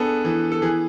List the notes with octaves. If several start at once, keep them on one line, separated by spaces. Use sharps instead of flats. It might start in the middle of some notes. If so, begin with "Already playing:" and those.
Already playing: B3 D4 G#4 A4 B4
E3
A4
E3 G#4